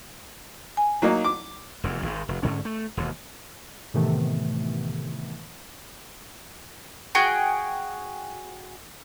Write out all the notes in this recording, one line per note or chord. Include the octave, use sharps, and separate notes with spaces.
G#5
F#3 A#3 D#4
D6
F1 E2
G#1 G#2
F1
G#2 D3 C#4
A3
E1 D#2
A2 C3 D#3 E3 A3 B3
F#4 G#4 G5